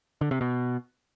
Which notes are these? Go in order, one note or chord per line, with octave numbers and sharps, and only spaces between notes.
D3
C3
B2